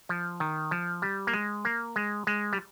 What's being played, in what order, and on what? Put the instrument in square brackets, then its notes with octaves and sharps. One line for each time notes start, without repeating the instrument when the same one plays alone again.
[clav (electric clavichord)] F3
D#3
F3
G3
A#3
G#3
A#3
G#3
G#3
G3